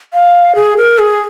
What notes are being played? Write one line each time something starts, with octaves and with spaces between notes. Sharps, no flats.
F5
G#4
A#4
G#4